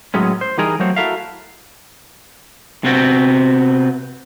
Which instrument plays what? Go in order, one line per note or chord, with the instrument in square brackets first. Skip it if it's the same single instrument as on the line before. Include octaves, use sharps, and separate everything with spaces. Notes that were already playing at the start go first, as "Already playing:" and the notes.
[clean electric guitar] A2 F#3 G#3 B3 C#4
C5
E3 G3 D#4 G#4 A#4 D#5
F#3 A3 A#3 C4 C5 C#5
E4 F#4 A4 A#4 E5 F5
C3 B3 C4 F#4